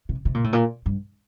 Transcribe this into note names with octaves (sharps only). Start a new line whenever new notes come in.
C3
C3
A#2
A2
A#2
G2